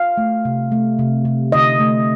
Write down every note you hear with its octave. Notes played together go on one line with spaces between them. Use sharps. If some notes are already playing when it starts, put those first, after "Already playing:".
Already playing: F5
A3
C3
A3
C3
C3
D3 D#5
A3